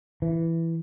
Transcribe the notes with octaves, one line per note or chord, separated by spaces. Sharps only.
E3